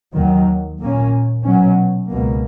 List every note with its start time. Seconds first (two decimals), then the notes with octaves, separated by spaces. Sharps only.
0.15 D#2 D#3 F#3
0.80 A#2 A#3 C#4
1.44 B2 F#3 C#4
2.09 C#2 B2 A#3